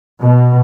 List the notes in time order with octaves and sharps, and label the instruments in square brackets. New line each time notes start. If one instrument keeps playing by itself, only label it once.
[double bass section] B2